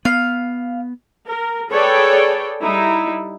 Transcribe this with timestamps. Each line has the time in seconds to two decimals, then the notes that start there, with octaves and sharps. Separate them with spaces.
0.05 B3 F5
1.26 A#4
1.71 G#4 A4 B4 C#5 D5 G5
2.62 G3 D#4 E4